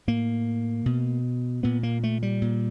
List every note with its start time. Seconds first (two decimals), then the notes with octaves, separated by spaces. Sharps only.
0.08 A2 A#3
0.86 B2
1.63 A#2 B3
1.83 A#3
2.03 A3
2.23 G3
2.42 A#2